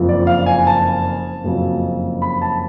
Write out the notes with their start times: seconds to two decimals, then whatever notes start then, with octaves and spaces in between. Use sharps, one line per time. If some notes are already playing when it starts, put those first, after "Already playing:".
Already playing: F#1 F2 F3
0.09 D5
0.27 F5
0.46 G#5
0.67 A5
1.44 F#1 F2 C#3 F#3
2.22 B5
2.42 A5